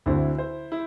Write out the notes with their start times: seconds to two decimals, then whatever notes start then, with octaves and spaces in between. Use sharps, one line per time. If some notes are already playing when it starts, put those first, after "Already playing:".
0.06 D2 D3 C4 E4
0.38 C5
0.72 E4